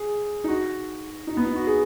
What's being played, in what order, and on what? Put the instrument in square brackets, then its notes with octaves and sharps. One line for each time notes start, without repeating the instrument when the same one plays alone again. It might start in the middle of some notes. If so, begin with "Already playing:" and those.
Already playing: [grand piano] G#4
D#4
F#4
D#4
B3
D#4
F#4
G#4